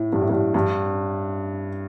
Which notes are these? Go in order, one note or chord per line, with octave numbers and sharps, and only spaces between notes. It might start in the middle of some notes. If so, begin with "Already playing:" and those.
Already playing: A2
G2
A2
G2
G2